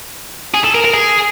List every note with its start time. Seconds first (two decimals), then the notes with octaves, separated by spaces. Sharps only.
0.54 G#4
0.64 A4
0.75 A#4
0.85 A#4
0.94 G#4